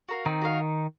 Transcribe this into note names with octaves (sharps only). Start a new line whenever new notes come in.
F#4 A#4 F5
D#3 C4 D#4
F#4 A#4 F5